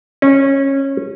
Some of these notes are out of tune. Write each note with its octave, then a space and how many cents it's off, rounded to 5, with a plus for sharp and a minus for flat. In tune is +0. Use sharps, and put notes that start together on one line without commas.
C#4 -20